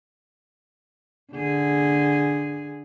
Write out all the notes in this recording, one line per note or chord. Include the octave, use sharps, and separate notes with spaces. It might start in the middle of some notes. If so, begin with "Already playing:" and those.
D3 G#4